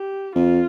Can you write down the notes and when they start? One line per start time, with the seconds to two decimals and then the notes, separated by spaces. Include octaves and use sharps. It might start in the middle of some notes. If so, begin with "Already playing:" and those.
Already playing: G4
0.35 F2 F4